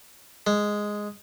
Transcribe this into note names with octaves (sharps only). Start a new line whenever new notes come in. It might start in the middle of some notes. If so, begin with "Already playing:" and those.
G#3